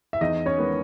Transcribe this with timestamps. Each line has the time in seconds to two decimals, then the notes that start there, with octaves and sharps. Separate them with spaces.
0.13 E5
0.21 E2 D#4 D#5
0.46 C#4 C#5
0.58 D#3 G#3 B3